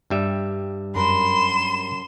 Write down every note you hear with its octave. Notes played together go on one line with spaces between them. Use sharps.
G2 G3 E5
F#2 A#4 B5 C6 E7